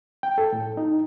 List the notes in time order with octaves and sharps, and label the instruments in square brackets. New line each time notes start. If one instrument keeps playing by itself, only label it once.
[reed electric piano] G5
A4
A2
D#4